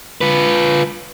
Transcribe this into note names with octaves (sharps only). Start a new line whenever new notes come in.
F4 B4